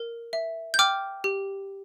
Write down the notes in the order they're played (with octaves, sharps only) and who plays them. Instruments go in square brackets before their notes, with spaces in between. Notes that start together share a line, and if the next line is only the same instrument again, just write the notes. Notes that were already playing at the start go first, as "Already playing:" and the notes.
Already playing: [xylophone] A#4
E5
G6
G5 D6 F6
G4